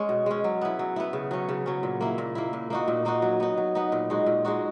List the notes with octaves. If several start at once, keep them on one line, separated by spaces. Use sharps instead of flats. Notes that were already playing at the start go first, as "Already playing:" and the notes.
Already playing: G#3 C#4
B2
G#3 C#4
F#3
B3 E4
F#3
B3 E4
C#3
F#3 C#4
C#3
F#3 C#4
A#2
A#3 E4
A#2
A#3 E4
A#2
A#3 D#4 F#4
A#2
A#3 D#4 F#4
F#3
B3 D#4
F#3
B3 D#4
A#2
G#3 D#4 F#4
A#2
G#3 D#4 F#4